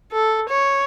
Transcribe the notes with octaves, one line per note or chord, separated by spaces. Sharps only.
A4
C#5